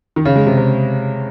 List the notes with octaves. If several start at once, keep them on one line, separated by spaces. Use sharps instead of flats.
D#3
C#3
G#3
C3
C3